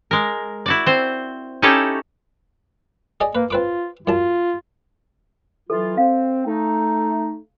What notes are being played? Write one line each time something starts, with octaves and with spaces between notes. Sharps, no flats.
G#3 A#4
E4 F#4 D5
C4 C5
C#4 D#4 E4 G4 A4 C#5
G#4 D5 D#5
A#3 B4
C4 F4 B4 D6
F#2 F4 A5
E3 F#3 F4 A4
C4 F5
A3 D#4